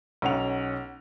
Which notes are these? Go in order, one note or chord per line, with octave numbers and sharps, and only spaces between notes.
B1 C#4 F#5 F7